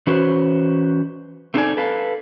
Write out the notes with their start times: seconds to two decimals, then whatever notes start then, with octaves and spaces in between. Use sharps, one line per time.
0.07 E3 C#4 F#4 B4 C5
1.54 A3 C4 D#4 A4 D5 G#5
1.77 A4 B4 F5